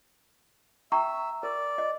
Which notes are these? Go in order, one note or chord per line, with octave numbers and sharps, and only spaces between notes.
E5 G5 A#5 C#6
A#4 D5
D#5